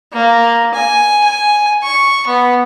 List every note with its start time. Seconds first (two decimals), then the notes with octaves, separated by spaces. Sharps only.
0.13 A#3
0.74 G#5
1.24 G#5
1.83 C#6
2.27 B3